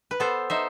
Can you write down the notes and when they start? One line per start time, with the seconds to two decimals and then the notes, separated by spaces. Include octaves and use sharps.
0.11 B4
0.20 B3 A4 C5
0.50 D#4 C5 E5